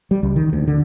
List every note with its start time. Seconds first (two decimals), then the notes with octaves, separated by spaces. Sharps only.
0.11 G3
0.23 C#2
0.36 D#3
0.53 D2
0.68 D3